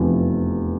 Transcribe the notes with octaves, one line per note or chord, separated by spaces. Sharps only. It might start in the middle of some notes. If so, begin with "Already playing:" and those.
Already playing: F1 E2 C3 F3